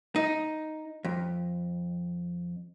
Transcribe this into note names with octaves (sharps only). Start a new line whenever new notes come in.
D#4
F2